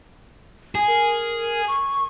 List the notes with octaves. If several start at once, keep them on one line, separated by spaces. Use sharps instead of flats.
G#4
A#4
C#6